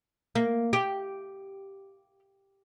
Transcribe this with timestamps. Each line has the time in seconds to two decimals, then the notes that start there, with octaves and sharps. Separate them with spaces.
0.35 A#3
0.73 G4